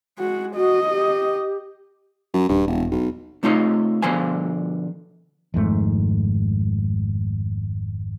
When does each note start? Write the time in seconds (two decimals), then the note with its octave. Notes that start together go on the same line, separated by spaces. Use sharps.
0.19 G#3 F#4
0.56 F#4 D#5
0.90 G4
2.34 F#2
2.49 D#1 G2
2.67 E1
2.91 B1
3.43 C3 A3 D#4 F4 C#5 D#5
4.02 B2 D3 F3 C5 F5 G#5
5.54 G#1 F2 G#2 A3